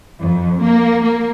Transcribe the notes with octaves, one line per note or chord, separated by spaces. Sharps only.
F2
A#3
A#3